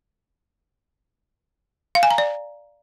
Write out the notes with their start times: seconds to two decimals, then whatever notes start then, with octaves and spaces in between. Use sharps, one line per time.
1.95 F5
2.03 G#5
2.11 A#5
2.18 D5